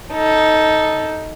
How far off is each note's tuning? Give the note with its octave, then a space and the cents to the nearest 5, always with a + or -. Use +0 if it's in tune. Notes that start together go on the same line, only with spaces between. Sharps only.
D#4 +10 A4 +0